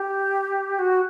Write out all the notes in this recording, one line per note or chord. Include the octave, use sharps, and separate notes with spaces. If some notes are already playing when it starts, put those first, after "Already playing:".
Already playing: G4
F#4